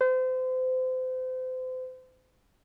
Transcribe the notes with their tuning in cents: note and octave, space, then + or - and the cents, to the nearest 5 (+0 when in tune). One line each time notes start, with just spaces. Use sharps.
C5 -35